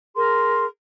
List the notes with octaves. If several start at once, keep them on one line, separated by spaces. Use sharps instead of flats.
G#4 A#4 C6